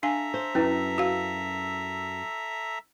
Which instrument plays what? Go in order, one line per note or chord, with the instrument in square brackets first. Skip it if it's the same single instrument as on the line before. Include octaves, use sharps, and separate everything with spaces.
[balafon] D4 F5 G#5 [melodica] A4 E5 A#5
[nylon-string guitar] C5
[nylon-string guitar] F#2 [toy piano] C#4 E4 B4
[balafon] F#4 F5